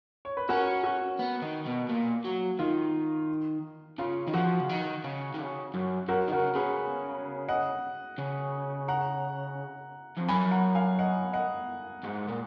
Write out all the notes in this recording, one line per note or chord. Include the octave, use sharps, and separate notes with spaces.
C#5
B4
C#4 F#4 A#4
F#4
B3
D#3
B2
A#2
F#3
D#3 F4
C#3 F4
D#3
F3 F#4
C#3
D#3
C#3
D#3
C#3
F#2
F#2 F#4 A#4
D#3
C#3 F#4 A#4
C#3 G#4 B4
D#5 F#5
C#3
F#5 A#5
F2
F#2 G#5 B5
F#5 A#5
F5 G#5
D#5 F#5
D#5 F#5
G#2
A#2